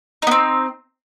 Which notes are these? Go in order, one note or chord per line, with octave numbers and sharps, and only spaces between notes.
B3 C4 D#4